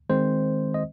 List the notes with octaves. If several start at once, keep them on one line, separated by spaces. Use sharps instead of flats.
D#3 G#3 C4 C5
D#5